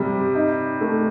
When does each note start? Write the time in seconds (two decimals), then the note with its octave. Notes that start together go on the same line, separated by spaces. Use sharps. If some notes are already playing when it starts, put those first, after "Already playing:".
Already playing: C3 G3
0.35 D#4
0.81 A3